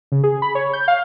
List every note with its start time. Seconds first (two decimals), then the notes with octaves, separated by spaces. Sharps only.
0.12 C#3
0.24 G#4
0.42 B5
0.55 C#5
0.73 G6
0.88 F5